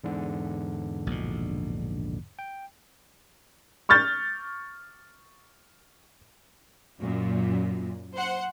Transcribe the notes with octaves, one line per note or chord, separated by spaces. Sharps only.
E2 G#2 D3
A#1 B2
G5
C#6 F6 G6 A6
F#2 A#2
C5 F#5